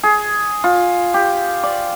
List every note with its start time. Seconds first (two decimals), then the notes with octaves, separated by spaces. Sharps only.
0.03 G#4
0.64 F4
1.14 G4
1.63 D5